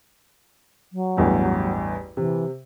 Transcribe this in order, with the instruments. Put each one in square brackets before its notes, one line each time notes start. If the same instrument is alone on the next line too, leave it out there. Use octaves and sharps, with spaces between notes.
[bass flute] F#3
[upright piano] A1 E2 G2
[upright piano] C3 [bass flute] E3